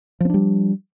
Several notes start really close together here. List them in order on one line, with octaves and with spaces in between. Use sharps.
F3 C4 D4 G3